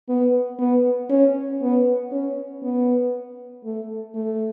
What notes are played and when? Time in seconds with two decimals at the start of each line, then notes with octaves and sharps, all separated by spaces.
0.09 B3
0.59 B3
1.10 C#4
1.62 B3
2.11 C#4
2.63 B3
3.65 A3
4.15 A3